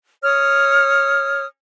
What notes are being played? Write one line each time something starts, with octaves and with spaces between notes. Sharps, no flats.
C#5 D#6 F6